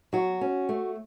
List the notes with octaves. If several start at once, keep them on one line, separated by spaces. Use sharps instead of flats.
F#3 F#4
C#4
A3